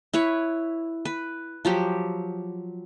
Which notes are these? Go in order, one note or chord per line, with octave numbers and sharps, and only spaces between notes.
E4 B4 C#5
B4
F3 F#3 G4